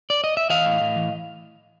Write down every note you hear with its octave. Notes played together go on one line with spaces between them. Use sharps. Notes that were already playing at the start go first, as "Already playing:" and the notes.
D5
D#5
E5
E3 D#5 F5
A2
A2
E3